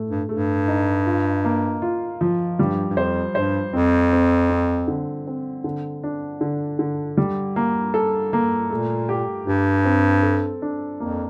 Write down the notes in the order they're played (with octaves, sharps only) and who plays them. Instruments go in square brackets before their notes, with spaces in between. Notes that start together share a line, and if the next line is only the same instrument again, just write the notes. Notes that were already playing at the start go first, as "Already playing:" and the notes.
Already playing: [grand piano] A2 A3
[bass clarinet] G2
[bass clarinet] G2 [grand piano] A3
[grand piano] D#4
F4
A#3
F4
F3
[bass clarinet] G2 [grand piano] G3
[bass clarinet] G2
[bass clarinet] F2 [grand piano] C5
[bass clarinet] G2 [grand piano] C5
[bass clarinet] F2 [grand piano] C4
[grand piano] C4
C4
D3
C4
D3
D4
D3
D3
G3
A#3
A4
A#3
[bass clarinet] A#2 [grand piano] A3
[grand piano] G4
[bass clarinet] G2 [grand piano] G4
[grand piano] C4
A4
D4
[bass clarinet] F2 [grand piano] A#3